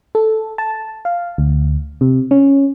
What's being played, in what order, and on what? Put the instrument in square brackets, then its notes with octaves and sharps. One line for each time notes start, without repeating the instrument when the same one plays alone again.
[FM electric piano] A4
A5
F5
D2
C3
C#4